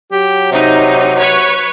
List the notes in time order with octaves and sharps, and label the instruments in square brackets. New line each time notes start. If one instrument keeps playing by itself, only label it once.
[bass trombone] F#3 [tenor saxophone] G4
[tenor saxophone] C3 [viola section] D#4
[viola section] B4 C#5